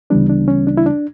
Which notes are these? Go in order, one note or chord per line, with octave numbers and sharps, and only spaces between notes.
D2 C#3 E3 G3 B3 D4
D4
C#4
D4
E4
D4